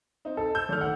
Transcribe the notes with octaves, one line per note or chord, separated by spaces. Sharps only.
C4 D#4
A4
E6 G6
G#1 A3 F6
F#5